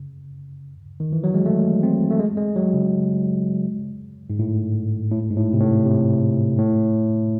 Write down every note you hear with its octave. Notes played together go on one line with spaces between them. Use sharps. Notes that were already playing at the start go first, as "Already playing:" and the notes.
Already playing: C#3
D#3
E3
F#3
G#3
A3
C4
A3
G#3
G#3
F#3
C#3
G#2
A2
A2
G#2
A2
C3
A2
C3
A2